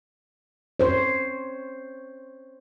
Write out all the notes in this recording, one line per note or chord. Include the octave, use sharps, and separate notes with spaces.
C5 C#5